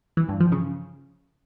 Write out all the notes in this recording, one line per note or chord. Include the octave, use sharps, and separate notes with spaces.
E3
G2
F3
C#3